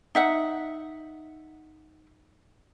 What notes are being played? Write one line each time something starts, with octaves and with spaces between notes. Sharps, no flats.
D#4 E5 F#5